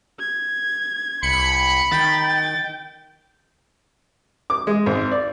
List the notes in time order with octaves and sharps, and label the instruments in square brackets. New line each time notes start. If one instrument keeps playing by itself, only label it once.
[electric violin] G#6
[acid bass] C2 [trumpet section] B5 [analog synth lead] C#7
[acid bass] D#3 [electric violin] G5 [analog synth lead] A6
[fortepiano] D6
G#3
G#1
D5